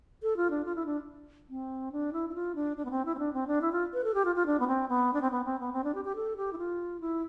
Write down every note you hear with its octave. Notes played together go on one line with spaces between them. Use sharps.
A4
F4
D4
F4
E4
D4
C4
D4
E4
E4
F4
D4
D4
B3
C4
E4
C4
D4
C4
D4
E4
F4
B4
A4
G4
F4
F4
D4
B3
C4
B3
D4
C4
B3
C4
B3
C4
D4
G4
G4
A4
G4
E4
F4
E4